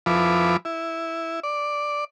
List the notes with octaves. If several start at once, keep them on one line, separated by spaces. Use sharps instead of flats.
F2 F3 E4 B4 D6
E4
D5